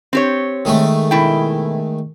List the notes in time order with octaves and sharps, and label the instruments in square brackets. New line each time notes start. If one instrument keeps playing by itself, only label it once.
[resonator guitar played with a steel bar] C4 G4 C#5
[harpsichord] D#3 G#3 A3
[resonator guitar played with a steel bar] B2 E4 G5